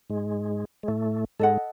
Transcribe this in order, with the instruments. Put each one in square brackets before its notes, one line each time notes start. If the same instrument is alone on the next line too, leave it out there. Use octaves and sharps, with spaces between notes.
[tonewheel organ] G#2 G#3
G#3
A2 A3
[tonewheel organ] G#2 G#3 [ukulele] A4 D#5 F#5